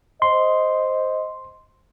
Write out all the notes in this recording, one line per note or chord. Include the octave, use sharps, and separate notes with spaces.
C5 D#5 C6